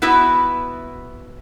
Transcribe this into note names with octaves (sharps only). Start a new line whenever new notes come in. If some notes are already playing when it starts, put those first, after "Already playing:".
B3 E4 F#4 B4 E5